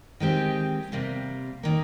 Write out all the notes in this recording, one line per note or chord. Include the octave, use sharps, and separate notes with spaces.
D#3 G#3 C4 G4
C3 G3 A#3
D#3 A#3